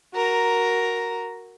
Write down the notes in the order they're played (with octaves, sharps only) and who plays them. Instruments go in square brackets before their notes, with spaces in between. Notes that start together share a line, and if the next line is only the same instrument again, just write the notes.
[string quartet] F#4 A#4 A#5